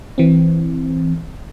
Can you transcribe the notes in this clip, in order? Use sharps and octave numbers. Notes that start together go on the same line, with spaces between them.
E3 C4